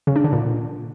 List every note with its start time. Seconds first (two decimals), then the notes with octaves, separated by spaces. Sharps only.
0.07 C#3
0.16 D4
0.24 D3
0.33 A#2